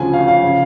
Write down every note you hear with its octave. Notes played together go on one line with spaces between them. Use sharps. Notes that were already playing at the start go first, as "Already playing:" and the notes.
Already playing: D2 C#3 F3 G#5
F5
F5
C#3 F3